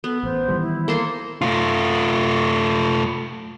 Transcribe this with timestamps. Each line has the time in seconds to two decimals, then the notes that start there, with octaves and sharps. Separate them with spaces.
0.04 B3 A4
0.24 A1 C5
0.48 D#3 E3 G3
0.60 E4
0.88 A#3 A4 C6
1.42 A3 F4